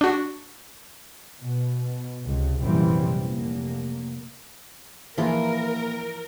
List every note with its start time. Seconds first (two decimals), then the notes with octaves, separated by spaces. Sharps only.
0.01 D4 F#4
1.41 B2
2.26 C#2 C3
2.59 A#1 F#2 C3 E3 G3 C4
3.20 F1 A#3
5.18 A#1 E3 F3 F4 A#4